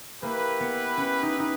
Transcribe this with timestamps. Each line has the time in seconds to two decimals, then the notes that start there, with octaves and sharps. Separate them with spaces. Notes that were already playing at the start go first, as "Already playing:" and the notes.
0.22 A#3 E4 G4 B4
0.60 B3
0.97 C#4
1.23 D#4
1.39 D#4